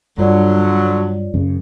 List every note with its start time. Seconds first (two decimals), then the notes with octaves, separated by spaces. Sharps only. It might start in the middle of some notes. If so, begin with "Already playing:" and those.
0.18 G2 D3 F#3 F4 C#5 D5
1.34 F#2 C#3